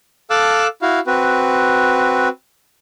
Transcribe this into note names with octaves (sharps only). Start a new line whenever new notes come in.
A4 F5 A5 D6 E6 F#6
E4 F#4 F5
C4 F#4 B4